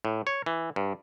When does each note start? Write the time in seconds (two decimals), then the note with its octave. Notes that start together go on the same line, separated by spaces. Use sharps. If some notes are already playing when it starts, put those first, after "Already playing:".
0.05 A2
0.27 C#5
0.46 E3
0.76 G2